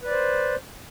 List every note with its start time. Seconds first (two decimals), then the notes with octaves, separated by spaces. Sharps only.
0.02 B4
0.06 D5
0.11 C5